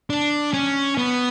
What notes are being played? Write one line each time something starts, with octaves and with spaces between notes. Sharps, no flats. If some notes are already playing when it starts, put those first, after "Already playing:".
D4
C#4
B3